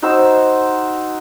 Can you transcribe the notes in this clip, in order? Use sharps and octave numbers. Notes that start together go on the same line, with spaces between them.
D#4 F#4 C5 E6